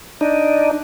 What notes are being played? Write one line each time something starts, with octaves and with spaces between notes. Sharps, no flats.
D4 D#4